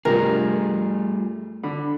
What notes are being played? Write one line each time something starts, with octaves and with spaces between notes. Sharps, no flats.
G2 C3 G3 A3 F4 G#4 A#4
D3 B5